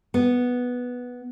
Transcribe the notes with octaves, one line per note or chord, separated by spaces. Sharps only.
B3